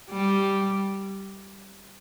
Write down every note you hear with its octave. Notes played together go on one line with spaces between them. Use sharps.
G3